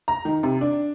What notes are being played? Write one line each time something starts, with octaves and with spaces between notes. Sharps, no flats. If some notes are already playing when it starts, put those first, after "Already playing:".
A#5
D#3
C3
D4